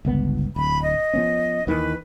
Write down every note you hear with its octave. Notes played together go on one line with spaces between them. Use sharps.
G1 C#2 B3
D1 B5
D#5
F3 B3 C#4
D#2 D#3 E3 B4